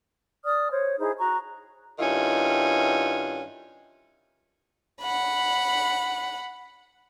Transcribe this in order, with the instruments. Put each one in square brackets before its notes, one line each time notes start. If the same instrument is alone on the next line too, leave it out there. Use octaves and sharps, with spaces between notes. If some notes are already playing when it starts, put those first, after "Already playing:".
[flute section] D5 D#6 F6
C5 C#5
D#4 E4 G#4 C5
F#4 A#5 C#6
[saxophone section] G2 D#3 C#4 E4 F4
[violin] F#5 B5